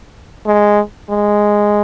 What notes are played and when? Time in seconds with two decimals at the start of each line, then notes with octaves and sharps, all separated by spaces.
0.47 G#3
1.10 G#3